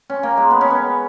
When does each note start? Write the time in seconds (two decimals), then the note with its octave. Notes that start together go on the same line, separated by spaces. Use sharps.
0.10 C#4
0.23 A#3
0.37 G#3
0.51 B3
0.61 C#4
0.70 B3